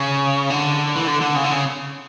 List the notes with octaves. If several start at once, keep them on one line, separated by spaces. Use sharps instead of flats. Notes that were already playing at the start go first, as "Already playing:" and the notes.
Already playing: C#3
D3
E3
D3
D3
C#3
D3
C#3